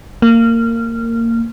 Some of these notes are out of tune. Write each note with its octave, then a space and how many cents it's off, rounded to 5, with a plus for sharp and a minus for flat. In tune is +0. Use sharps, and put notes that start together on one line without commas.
A#3 -20